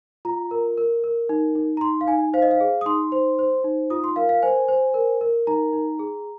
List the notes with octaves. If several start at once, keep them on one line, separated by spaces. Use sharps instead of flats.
F4 A#5
A#4
A#4
A#4
D#4
D#4
A#5
D#4 C6
F5
D#4 G#5
C5 F5
D#5
F5
G#4
D#6
D#4 C6
C5
C5
D#4
F4 D#6
C6
A#4 F5
F5
C5 G#5
C5
A#4
A#4
D#4 A#5
D#4
G#4